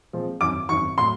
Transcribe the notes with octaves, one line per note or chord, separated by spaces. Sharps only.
A#2 F3 G#3 C4
G#1 F#2 D#3 D6
G#1 F#2 D#3 C#6
A2 F#3 C6